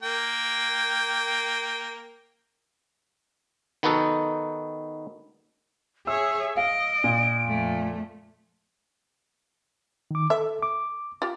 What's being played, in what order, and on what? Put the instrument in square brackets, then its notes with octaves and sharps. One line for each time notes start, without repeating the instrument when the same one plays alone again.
[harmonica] A#3 G5
[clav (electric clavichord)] D#3 B3 D#4 F#4 A4
[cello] G#4 C#5 [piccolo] E5 [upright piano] E6
[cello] D#5 [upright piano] F5 [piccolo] D7
[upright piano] A#2
[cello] F2 A3
[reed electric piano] D#3 D6
[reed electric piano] A4 [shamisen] E5
[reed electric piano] D6
[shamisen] F4 G4